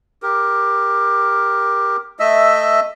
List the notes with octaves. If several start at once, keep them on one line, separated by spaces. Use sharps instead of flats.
G4 A#4
A3 D#5 E5 E6